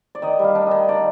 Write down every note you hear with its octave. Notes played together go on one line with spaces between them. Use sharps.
D5
D#3 D#5
G3
F5
D4
D#3 D#5
D#3 D5